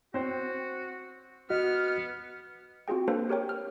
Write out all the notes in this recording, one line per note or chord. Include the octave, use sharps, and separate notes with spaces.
C4 F#4 C5
B3 F#4 D#5 F6
C4 F4 F#4 G#4 G5
A#3 D4 A4 B4 C5
G4 A#4 C#5 G5
F6